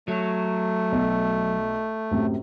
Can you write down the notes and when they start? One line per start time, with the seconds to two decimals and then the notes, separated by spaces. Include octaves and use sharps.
0.08 F#3 A3
0.92 B1
2.11 F#2 A2 C3